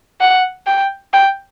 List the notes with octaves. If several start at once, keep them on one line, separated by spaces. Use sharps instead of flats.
F#5
G5
G5